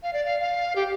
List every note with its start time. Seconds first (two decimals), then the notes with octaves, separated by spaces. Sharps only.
0.03 F5
0.13 D5
0.25 F5
0.40 F5
0.76 G4